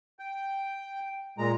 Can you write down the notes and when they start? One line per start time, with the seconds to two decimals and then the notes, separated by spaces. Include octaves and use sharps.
0.19 G5
1.38 A#2 G#3 A#5